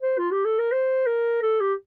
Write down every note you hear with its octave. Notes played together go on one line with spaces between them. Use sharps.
C5
F4
G4
A4
A#4
C5
A#4
A4
G4